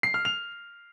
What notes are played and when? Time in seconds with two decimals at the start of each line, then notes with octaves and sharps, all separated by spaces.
0.03 C7
0.14 F6
0.25 F7